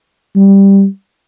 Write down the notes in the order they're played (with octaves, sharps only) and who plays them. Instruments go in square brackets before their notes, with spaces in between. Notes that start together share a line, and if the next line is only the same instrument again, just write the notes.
[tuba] G3